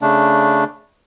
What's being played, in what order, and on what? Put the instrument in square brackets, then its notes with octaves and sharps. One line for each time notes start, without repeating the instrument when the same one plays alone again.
[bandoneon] C#3 A3 D4